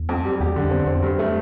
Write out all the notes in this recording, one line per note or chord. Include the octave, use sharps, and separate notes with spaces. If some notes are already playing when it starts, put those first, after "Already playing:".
Already playing: E2
F2
G3
E2 G4
D3
F2
C4
F2 C4
G2
A3